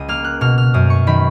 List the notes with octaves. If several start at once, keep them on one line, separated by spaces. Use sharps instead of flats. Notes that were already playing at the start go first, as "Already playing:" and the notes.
Already playing: C#2 D#6
A#3 F6
F#6
B2 F6
F6
F#2 D#6
C#6
D#3 B5